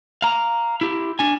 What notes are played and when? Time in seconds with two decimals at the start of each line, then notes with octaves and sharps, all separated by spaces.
0.22 F5 A#5
0.81 E4 G4
1.19 D4 G#5